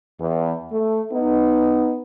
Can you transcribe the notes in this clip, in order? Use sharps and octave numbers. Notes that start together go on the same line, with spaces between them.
E2
A3
B3 D#4